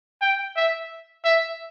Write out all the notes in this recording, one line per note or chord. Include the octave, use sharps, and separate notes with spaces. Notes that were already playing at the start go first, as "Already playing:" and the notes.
G5
E5
E5